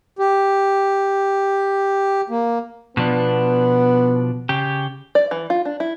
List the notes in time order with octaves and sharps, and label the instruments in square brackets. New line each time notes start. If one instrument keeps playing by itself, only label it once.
[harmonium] G4
A#3
[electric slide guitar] B2 F3 D4 [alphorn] B3
[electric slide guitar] C#3 G4
[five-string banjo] D5
E3
F4
D4
E4